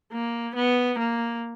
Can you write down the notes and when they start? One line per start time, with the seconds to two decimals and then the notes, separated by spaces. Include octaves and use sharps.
0.12 A#3
0.55 B3
0.99 A#3